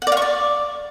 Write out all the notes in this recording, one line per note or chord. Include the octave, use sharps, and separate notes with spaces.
F#5
D5
F5
C#6
D5